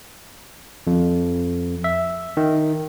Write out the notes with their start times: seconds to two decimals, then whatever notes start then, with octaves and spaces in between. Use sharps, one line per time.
0.87 F2
1.84 E5
2.37 D#3